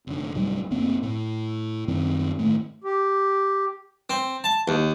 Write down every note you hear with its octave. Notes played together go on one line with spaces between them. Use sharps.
F1 D3
C2 G#2 F#3 G3
F#1 D2 A#3 C4
A2
F#2 D#3 C4
G1 A2 D#3 A3
G4
C4
A5
D#2